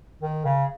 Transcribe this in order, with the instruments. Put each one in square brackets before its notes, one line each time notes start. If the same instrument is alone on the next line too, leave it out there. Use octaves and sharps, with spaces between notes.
[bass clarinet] D#3
C#3